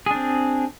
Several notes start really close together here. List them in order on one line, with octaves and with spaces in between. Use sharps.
G#4 D4 C4